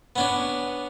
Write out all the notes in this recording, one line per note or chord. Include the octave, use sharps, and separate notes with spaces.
B3 C#4 D4